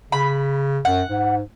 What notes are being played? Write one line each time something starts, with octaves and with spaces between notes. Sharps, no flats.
C#3 B5
F#2 F#5
G#2